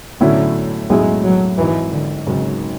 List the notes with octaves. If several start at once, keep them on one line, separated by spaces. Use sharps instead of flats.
B1 A2 D3 F#3 C#4 E4
B1 A2 F#3 G#3 C#4 E4
F#3
G#1 G#2 E3 F#3
D3
G#1 G#2 C#3 F#3